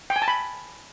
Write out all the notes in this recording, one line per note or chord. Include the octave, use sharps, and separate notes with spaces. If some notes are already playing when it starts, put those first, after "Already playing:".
G5
G#5
A5
B5